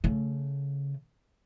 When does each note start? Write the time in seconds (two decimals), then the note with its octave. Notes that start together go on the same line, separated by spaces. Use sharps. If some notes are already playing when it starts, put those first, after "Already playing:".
0.04 C#3 A3